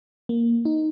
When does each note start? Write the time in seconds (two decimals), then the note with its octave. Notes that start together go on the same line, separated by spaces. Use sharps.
0.29 A#3
0.65 D#4